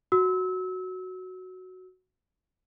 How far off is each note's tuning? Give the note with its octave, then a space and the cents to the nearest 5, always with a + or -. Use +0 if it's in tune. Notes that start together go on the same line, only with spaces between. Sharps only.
F#4 +0 E6 -30